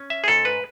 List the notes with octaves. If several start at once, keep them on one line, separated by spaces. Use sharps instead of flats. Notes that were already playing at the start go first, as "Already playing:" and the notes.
Already playing: C#4
E5
G#4
G#2 A4
B4